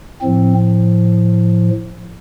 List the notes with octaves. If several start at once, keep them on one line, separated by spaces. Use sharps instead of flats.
A2 F3 C4